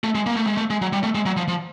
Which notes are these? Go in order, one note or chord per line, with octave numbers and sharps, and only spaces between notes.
A3
G#3
A#3
A3
G#3
A3
G#3
F#3
G3
A3
G#3
F#3
F3
F3